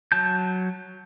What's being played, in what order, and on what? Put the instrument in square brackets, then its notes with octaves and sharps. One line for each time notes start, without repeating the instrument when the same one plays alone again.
[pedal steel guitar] F#3 A5 G6